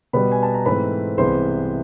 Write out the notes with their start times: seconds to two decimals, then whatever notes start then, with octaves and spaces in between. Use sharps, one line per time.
0.13 B2 G3 B3 B4 B5
0.32 G#5
0.43 A5
0.54 A#5
0.66 G#2 E3 A3 C4 B4 B5
1.18 C2 C3 E3 G#3 B3 C5 C6